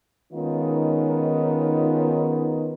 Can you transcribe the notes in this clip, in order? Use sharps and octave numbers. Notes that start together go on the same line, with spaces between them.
D#3 G#3 B3 C#4 D#4 F4